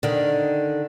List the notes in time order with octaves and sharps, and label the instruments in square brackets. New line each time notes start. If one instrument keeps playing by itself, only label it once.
[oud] D3 D#3